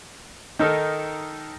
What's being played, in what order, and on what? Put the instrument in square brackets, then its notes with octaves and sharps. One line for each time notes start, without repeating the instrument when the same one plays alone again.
[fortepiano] D#3 D#4 A4 A#4